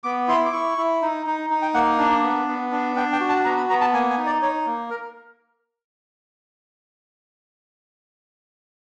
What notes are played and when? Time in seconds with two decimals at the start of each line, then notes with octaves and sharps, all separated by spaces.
0.04 B3 D6
0.28 E4 C6
0.45 D6
0.53 E4 C#6
0.78 E4
1.02 D#4
1.26 D#4
1.50 D#4
1.62 G5
1.74 A#3 F#5
1.98 D4
2.23 B3
2.48 B3
2.72 D4
2.96 D4 G5
3.12 G5
3.20 F#4
3.29 A5
3.44 B3 A#5
3.57 B5
3.69 B3 A#5
3.81 A5
3.93 A#3 G#5
4.10 G#5
4.18 D#4
4.26 D5
4.42 D#4 C#5
4.66 A#3
4.90 A#4